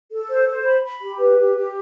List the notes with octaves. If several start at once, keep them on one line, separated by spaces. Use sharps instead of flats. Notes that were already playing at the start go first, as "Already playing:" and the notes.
A4
C5
C5
B5
B5
G4
B4
G4
G4